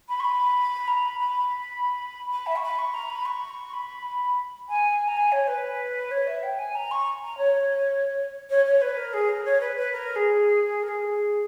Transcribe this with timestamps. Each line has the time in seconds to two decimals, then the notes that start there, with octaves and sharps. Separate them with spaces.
0.08 B5
0.20 C#6
0.24 B5
0.87 A#5
1.02 B5
1.19 B5
2.30 B5
2.46 E5
2.56 C#6
2.62 B5
2.78 C#6
2.94 A#5
3.10 B5
3.25 C#6
3.73 B5
4.68 G#5
5.08 A#5
5.16 G#5
5.32 C#5
5.47 B4
6.11 C#5
6.27 E5
6.43 G5
6.58 G#5
6.75 A#5
6.91 C#6
7.23 A#5
7.38 C#5
8.50 C#5
8.65 C#5
8.81 B4
8.97 A#4
9.13 G#4
9.28 A#4
9.45 C#5
9.60 B4
9.76 B4
9.92 A#4
10.15 G#4
10.83 A#4
10.88 G#4